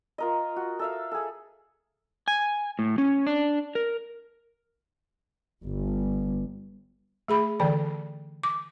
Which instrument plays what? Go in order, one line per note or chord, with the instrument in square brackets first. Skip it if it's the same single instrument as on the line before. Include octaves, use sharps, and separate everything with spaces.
[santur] F4 A#4 D#5
F#4
A4 E5 F5
G#4 A4
[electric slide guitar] G#5
A2
C#4
D4
A#4
[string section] G1
[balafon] A3 G#4 B5
D3 E3 D5 G5
D6